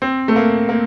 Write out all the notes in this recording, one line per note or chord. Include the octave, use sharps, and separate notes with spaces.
C4
A3
A#3
A#3